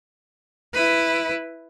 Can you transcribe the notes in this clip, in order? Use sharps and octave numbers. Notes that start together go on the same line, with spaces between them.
E4 B4